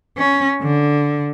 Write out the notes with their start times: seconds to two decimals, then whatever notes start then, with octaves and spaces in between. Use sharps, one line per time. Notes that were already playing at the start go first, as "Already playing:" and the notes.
0.18 C#4
0.62 D3